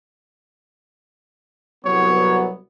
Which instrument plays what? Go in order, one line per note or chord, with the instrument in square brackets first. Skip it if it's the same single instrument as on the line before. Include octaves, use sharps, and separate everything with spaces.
[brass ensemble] C2 F#3 B3 [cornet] C#5